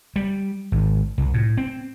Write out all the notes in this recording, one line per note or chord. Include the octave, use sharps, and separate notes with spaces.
G3
G#1
C2
A2
C4